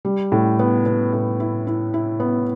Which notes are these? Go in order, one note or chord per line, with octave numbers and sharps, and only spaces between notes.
G3
A2
B3
B3
A2
E4
E4
E4
B3